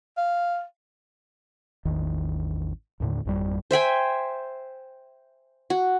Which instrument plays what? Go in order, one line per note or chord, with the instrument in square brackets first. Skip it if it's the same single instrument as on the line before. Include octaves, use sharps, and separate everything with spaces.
[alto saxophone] F5
[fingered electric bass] A1 E2 D#3
D#2 A2 D3
G#1 F2 G3
[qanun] C5 E5 G5 G#5
F#4